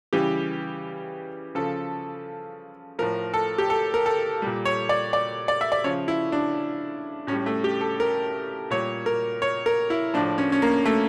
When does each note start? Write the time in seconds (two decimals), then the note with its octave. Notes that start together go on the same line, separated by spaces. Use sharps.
0.13 C#3 E3 G3 G4
1.55 C#3 F3 A4
2.99 A2 F3 A#4
3.34 A4
3.58 G4
3.70 A4
3.94 A#4
4.06 A4
4.42 A#2 G3
4.65 C#5
4.89 D5
5.13 D5
5.48 D5
5.61 E5
5.72 D5
5.84 C#3 F3 C#5
6.08 E4
6.32 D4
7.27 A2 C#4
7.32 G3
7.46 A3
7.64 G4
7.81 A4
8.00 A#4
8.71 A#2 G3 C#5
9.06 A#4
9.42 C#5
9.66 A#4
9.90 E4
10.14 A2 F3 D4
10.38 C#4
10.52 C#4
10.62 A#3
10.85 A3